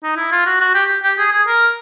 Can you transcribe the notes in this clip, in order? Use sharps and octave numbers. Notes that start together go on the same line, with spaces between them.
D#4
E4
F4
F#4
F#4
G4
G4
G#4
G#4
A#4